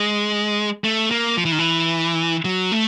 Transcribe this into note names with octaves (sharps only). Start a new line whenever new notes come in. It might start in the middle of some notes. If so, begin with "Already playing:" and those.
Already playing: G#3
A3
A#3
F3
E3
D#3
E3
F#3
A3